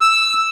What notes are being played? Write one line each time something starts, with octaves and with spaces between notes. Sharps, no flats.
E6